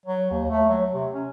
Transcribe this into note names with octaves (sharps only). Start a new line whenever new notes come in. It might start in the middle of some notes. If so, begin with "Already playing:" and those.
F#3
D#2
A3
F#3
C3
C#4